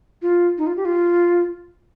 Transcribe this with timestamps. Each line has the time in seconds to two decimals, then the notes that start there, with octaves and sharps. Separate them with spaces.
0.22 F4
0.58 D#4
0.67 F4
0.77 G4
0.85 F4